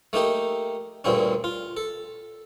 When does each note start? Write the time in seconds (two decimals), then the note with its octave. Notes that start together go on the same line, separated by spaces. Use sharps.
0.13 A3 A#3 D#4 G4
1.04 D2 G2 A#2 C4 C#4
1.44 F4
1.77 A4